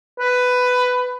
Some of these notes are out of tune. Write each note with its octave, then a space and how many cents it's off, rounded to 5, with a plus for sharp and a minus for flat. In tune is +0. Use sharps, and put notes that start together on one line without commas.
B4 +10